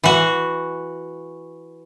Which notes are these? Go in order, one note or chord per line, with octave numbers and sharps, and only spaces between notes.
E3 F#4